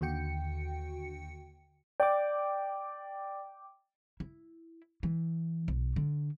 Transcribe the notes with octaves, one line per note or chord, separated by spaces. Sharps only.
D#2 D3 F#4 G5 C#7
D5 G5 D6
E4
E3
B1
D3